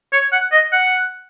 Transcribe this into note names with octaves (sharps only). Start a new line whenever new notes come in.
C#5
F#5
D#5
F#5